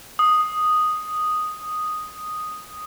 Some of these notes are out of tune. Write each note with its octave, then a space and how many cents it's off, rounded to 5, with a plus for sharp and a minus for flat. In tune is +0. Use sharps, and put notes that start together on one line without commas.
D#6 -5